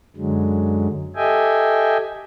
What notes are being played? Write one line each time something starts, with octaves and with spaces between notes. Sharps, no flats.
F#2 D3 F#3 G#3
G4 A4 D#5 E5 G5 G#5